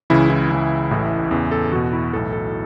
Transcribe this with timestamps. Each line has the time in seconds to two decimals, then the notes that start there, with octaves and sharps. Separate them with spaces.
0.10 C#2 C#3 E3 E4
0.30 E4
0.50 C#2 C#3 E3
0.91 A1 A2 E3
1.31 E2 C#3 E3
1.51 A4
1.72 E2 B2 F#4
1.93 E4
2.13 B1 A2 E3 A4
2.33 A4